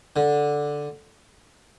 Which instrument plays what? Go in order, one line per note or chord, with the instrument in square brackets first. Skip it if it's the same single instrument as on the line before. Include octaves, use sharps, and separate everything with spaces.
[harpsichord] D3